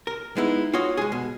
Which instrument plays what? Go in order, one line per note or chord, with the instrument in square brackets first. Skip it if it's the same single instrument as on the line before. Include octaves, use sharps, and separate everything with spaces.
[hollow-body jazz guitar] A#4
G#3 B3 D#4 E4
F4 F#4 C#5 D#5
G#3 G#4
B2